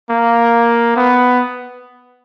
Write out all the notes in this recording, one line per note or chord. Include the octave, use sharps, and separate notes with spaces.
A#3
B3